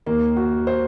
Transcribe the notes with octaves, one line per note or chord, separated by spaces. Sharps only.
D#2 D#3 A#3
F#4
C5